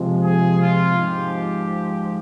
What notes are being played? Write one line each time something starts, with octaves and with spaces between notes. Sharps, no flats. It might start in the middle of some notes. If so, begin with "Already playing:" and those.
Already playing: C3 F3 G#3
G#4
F4
G#2 F3 G#3 G4